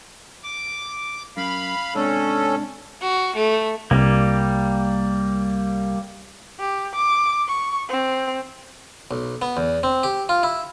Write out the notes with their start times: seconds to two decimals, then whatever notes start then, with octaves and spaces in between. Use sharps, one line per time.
0.44 D6
1.37 F#2 F5 B5
1.95 G#2 C3 C#4 D4 A4
3.01 F#4
3.36 A3
3.91 C2 G3 A#3
6.60 G4
6.96 D6
7.48 C#6
7.89 C4
9.11 B1
9.42 B3
9.57 E2
9.83 C4
10.03 G4
10.29 F4
10.43 E4